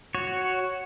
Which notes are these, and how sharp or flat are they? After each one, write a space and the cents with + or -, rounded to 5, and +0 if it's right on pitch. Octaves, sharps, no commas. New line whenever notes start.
F#4 +0 C#5 +0